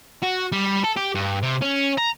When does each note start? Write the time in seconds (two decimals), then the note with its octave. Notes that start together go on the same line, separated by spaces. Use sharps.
0.22 F#4
0.52 G3
0.84 A4
0.96 G4
1.15 G2
1.43 C3
1.62 C#4
1.98 A#5